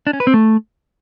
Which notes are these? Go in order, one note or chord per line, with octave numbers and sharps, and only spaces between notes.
D4
C#4
B4
C4
A3